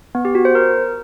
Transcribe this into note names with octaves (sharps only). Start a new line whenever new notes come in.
B3
G4
F#4
C5
A#4